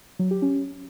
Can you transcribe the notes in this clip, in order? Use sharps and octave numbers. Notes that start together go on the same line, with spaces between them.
F#3
G4
C#4